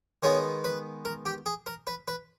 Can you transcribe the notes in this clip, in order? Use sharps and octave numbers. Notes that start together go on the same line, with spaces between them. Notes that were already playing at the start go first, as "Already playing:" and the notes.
D#3 G#3 B3 C#5
B4
A#4
G4
G#4
A#4
B4
B4